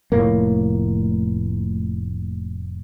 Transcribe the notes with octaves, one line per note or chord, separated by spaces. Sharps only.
F1 A2 A#3